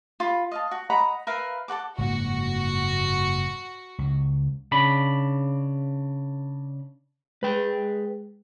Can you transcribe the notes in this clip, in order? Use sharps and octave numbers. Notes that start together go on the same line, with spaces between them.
F4 B5
D#5 F5 A5
F#4
D#5 F#5 A#5 B5
A#4 B4 E5 F5
A4 A#4 F#5 D6
F#1 G#2 A#3 F#4
C#2
C#3 D4 B5
G#3 B4 G5